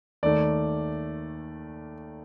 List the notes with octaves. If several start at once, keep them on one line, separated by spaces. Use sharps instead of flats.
D#2 D#3 A3 D5